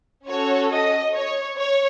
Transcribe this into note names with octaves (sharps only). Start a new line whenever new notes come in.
C#4 F#4 A4 C#5
D#5
C#5
C#5